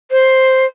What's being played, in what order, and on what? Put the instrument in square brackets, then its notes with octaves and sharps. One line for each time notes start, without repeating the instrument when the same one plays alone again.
[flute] C5